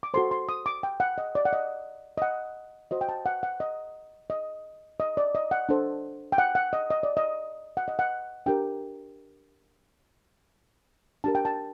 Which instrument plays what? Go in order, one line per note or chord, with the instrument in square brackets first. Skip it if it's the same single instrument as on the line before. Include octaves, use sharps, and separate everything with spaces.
[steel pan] D6
F#4 A4 C5 C6
C6
D#6
D6
G5
F#5
D#5
D5
F#5
D#5
D#5
F#5
F#4 C5 D#5
G5
A5
F#5
F#5
D#5
D#5
D#5
D5
D#5
F#5
D4 A4 C5
G5
F#5
F#5
D#5
D#5
D5
D#5
F#5
D#5
F#5
D4 G4 A#4 G5
D4 G4 A#4 A5
G5
A5